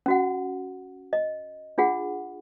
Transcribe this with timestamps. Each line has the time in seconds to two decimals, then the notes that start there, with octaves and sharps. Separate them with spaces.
0.06 C#4 F#4 F#5
1.13 D#5
1.78 D4 F4 G#4 F#5